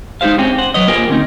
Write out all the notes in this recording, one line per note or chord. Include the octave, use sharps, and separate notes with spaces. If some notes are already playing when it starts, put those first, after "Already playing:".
G#3 D#4 E4 G4 C5 F5
G#3 C4 C#4 G4
C5 F#5
F#3 B4 C#5 D#5
A#3 F4 G4 G#4 A#4 C5
D2 C4 C#4 D#4